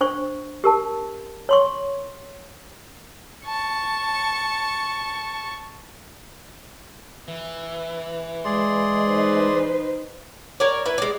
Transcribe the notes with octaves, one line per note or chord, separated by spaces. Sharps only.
D4 C5 C#6
G4 A#4 A5
C#5 C6 C#6
A5 C#6
E3
G#3 G#4 D5 C6
D#4 B4 C5
A#4 C#5 D5
E4 B4
G#3 D5